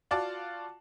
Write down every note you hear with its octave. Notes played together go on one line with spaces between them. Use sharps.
F4 F#4 D5 A5